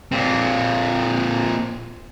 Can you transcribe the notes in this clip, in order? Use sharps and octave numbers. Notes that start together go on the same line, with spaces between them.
A#2 C4